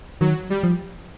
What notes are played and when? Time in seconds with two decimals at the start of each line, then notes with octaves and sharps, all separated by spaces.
0.21 D#3 F#3
0.50 G3
0.63 F3